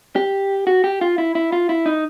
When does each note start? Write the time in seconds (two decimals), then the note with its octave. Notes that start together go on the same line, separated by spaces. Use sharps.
0.16 G4
0.67 F#4
0.84 G4
1.01 F4
1.18 E4
1.35 E4
1.52 F4
1.69 E4
1.86 D#4